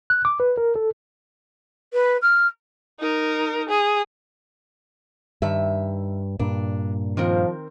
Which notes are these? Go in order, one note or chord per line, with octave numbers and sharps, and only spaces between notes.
F#6
D6
B4
A#4
A4
B4
F6
D#4 A#4
G#4
G2 D#3 E5
G2 A#2 D4
D#3 F3 C4 A#4